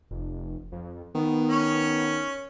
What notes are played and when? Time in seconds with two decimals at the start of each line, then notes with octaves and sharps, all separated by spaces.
0.11 F1
0.72 F2
1.15 D#3 B3
1.49 C#4 C#5